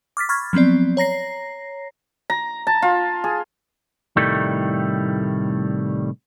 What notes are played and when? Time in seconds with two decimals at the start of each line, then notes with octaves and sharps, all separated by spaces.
0.17 D6 F6 A6 B6
0.29 B5 C#6 F6 G#6 A6
0.53 F3 F#3 B3 C4 D5
0.97 C#5 A#5 A#6 C7
2.30 A#5
2.67 A5
2.82 F4
3.24 G#4
4.17 C2 A2 D#3 G3 A3